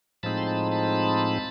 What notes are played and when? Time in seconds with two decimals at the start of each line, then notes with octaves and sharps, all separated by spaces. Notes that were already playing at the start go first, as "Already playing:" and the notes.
0.23 A2 F3 G#3 C4 D#4 A5 B5
0.37 C6
0.47 A5 B5
0.71 A5 B5